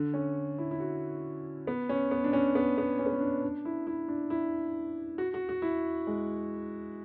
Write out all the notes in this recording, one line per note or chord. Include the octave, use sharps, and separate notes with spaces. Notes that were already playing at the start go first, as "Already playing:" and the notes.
Already playing: D3
C#4
E4
E4
F#4
B3
C#4
B3
D4
C#4
B3
B3
C#4
B3
C#4
D4
D4
E4
E4
D4
E4
F#4
F#4
F#4
E4
G#3